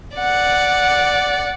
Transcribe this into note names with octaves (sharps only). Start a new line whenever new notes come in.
D5 F#5